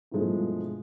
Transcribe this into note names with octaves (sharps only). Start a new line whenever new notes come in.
G2 B2 E3 F3 G#3 A3